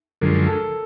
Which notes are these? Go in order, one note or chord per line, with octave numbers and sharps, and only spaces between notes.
F#2 D3 F3 G#3 A#4
A4